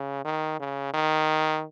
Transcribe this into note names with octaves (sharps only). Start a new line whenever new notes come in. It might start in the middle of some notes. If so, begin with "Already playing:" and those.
Already playing: C#3
D#3
C#3
D#3